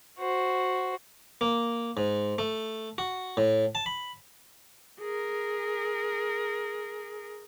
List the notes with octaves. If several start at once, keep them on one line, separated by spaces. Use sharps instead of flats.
F#4 C5
A#3
G#2
A3
F#4
A2
A5
B5
G#4 A#4